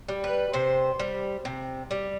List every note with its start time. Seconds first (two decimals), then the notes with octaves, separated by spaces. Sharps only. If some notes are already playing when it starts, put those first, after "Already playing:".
0.08 G3
0.24 B4
0.53 C3 C5
0.99 G3
1.45 C3
1.91 G3